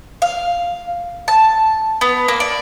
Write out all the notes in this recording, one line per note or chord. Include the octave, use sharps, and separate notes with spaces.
F5
A5
B3
A#3
D5